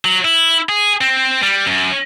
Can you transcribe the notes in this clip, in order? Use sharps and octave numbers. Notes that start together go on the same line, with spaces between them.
F#3
E4
G#4
C4
G3
F#2